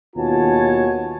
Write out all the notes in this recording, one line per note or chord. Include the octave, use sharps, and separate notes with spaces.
D#2 B2 F4 C#5 G#5 A5